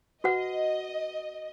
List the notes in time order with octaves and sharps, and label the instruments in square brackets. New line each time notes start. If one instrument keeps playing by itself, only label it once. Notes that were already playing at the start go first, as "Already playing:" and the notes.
[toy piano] F#4 B4 F#5 [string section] D#5